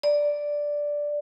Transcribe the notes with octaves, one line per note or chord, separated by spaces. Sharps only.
D5